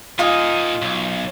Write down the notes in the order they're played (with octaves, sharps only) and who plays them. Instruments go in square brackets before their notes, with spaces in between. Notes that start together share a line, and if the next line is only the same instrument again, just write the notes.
[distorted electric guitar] A#2 D#4 [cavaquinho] F4 D#5 G#5
[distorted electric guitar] B1